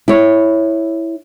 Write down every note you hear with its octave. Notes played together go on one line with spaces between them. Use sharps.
E4 C#5